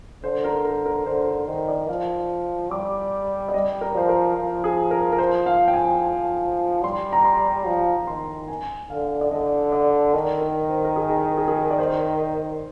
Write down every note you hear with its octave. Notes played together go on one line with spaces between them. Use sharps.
D3 C5
A#4
A#4
A#4
D3 C5
A#4
D#3 C5
D5
F3 F5
G3 D6
D5
G3 D#5
A#4
F3 C5
A#4
F3
G#4
A#4
A#4
C5
F5
G5
G#5
G3 C6
A#5
C6
F3
D#3 C6
G#5
D3 F5
D5
D3 D#5
D5
D#3 A#4
A#4
C5
A#4
G#4
G#4
A#4
G#4
G#4
A#4
D5
C5